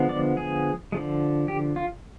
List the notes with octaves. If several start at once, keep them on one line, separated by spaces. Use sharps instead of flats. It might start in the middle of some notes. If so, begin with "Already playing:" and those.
Already playing: D3 F3 G#3 B3
D5
G#4
D3 F3 G#3
G4
F4